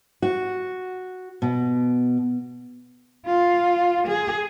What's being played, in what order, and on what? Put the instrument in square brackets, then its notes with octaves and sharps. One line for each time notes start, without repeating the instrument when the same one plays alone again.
[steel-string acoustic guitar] F#4
B2
[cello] F4
G#4